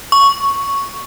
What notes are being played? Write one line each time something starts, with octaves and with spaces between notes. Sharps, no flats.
C#6